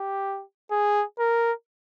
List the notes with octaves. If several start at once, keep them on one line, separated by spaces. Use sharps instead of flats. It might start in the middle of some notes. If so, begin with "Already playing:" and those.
Already playing: G4
G#4
A#4